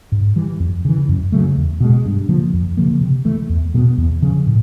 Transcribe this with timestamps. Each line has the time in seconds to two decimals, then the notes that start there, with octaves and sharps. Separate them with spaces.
0.12 G#2
0.36 E3 G3
0.60 F2
0.85 C#3 E3
1.09 F#2
1.32 C#3 F#3 A3
1.57 E2
1.80 B2 G#3
2.06 G2
2.29 D3 F3 A#3
2.53 F2
2.77 C#3 F3 A#3
3.01 C3
3.25 E3 A3
3.49 E2
3.74 B2 G#3
3.78 B3
3.98 E2
4.22 C#3 F3
4.47 A2